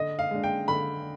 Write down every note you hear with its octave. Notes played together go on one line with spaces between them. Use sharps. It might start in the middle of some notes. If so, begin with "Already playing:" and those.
Already playing: D3 D#5
F5
G#3 D4
G5
D3 B5